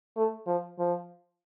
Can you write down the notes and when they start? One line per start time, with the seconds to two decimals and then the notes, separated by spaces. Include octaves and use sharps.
0.17 A3
0.47 F3
0.79 F3